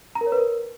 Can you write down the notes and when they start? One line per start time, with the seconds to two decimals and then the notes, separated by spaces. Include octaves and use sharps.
0.15 A#5
0.21 A#4
0.27 C#5
0.32 B4
0.38 A#4